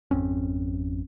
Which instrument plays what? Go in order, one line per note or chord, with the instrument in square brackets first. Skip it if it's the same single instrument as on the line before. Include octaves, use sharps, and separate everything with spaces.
[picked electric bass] G#1 F2 C4 C#4